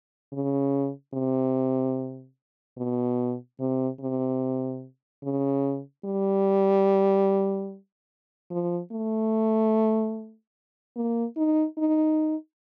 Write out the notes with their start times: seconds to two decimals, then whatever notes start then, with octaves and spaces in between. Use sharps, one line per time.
0.33 C#3
1.14 C3
2.77 B2
3.60 C3
4.00 C3
5.23 C#3
6.05 G3
8.51 F3
8.92 A3
10.96 A#3
11.37 D#4
11.78 D#4